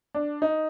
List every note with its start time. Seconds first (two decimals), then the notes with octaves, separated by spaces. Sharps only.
0.15 D4
0.42 D#4